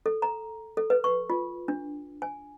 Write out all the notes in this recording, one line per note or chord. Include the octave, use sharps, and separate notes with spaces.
A4
A#5
A4
B4
C#6
F4
D4
G#5